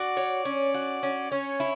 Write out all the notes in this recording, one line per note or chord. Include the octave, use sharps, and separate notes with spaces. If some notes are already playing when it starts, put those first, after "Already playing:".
Already playing: F#4 D5
C#5
C#4
F#4
C#4
C#4 C#5
E4